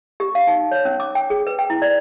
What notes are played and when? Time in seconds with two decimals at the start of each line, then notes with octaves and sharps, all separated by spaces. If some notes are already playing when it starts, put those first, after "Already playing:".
0.20 G4
0.35 F5
0.47 D#4
0.71 C#5
0.85 C#4
1.00 D6
1.15 G5
1.30 G#4
1.47 B4
1.59 G5
1.70 E4
1.82 D5